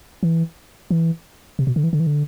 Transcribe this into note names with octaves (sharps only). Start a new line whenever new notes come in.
E3
E3
C3
B2
D3
E3
D3
E3
D3